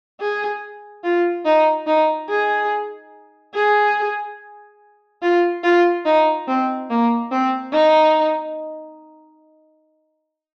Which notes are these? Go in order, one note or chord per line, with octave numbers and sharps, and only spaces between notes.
G#4
F4
D#4
D#4
G#4
G#4
F4
F4
D#4
C4
A#3
C4
D#4